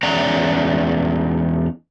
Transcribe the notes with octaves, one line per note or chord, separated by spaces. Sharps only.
E2 G#3 C#4 D5 F#5 A#5